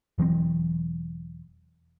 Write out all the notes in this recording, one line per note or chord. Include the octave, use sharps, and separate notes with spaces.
E1 E3 F#3 C4